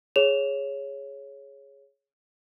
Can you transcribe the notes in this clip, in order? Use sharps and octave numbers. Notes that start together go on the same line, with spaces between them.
G#4 C#5 E7 F7